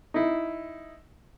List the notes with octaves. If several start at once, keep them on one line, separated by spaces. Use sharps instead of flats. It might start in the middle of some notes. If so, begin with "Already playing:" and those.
D#4 E4